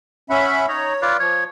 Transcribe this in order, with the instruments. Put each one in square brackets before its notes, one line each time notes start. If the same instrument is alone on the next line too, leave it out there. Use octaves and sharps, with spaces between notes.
[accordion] C#4 E5 B5 [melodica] F#5
[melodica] D#4 A#5 [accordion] C#5
[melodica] F4 B4 D5
[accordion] F3 [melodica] C#5